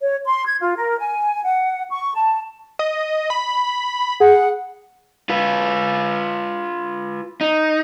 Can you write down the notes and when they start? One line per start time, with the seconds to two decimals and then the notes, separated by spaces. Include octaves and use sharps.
0.01 C#5
0.26 C6
0.47 G#6
0.60 F4
0.76 A#4
0.99 G#5
1.45 F#5
1.91 C#6
2.14 A5
2.79 D#5
3.30 B5
4.20 G#4 F#5
5.29 F4 B4
7.41 D#4